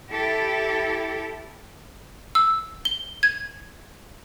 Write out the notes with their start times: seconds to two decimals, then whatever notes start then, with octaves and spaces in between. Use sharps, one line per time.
0.10 E4 G4 A4
2.35 E6
2.85 G7
3.23 G#6